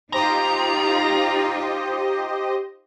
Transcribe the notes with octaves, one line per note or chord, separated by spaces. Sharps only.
D#4 F4 G4 C5 D#5 A#5